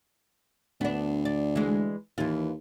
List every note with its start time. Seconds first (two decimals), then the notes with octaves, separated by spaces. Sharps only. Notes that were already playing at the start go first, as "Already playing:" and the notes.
0.81 D2 B3 D4
1.25 D5
1.56 E3 G#3
2.18 D#2 E3 F4